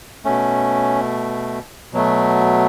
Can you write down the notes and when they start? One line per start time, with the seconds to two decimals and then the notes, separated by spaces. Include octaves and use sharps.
0.25 B2 A3 C#4
1.93 B2 F#3 A3